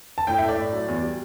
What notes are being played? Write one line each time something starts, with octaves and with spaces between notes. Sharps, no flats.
A5
A2 G5
A3 E5
D5
A2
F#3
E2
G3